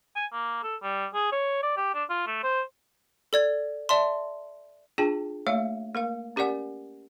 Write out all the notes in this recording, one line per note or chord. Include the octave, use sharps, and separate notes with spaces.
G#5
A#3
A4
G3
G#4
C#5
D5
G4
D4
F4
A3
C5
A4 D5 G#6
D5 E5 A5 C6
D4 F4 G#4 G5 A5
A3 A#3 C#5 E5 F5
A#3 A#4 F5
C#4 G4 A#4 D5 F#5 G#5